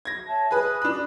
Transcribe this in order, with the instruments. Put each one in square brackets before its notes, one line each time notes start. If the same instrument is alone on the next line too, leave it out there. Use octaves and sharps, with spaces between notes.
[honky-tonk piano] G#6 A#6
[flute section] C#5 E5 A5
[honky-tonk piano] G#4 B4 [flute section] D#6 F#6
[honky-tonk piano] D4 B5